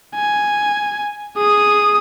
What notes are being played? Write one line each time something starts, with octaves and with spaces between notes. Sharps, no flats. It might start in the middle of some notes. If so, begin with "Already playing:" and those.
G#5
G#4 D#6